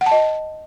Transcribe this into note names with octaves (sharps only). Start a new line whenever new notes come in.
F#5
A5
D#5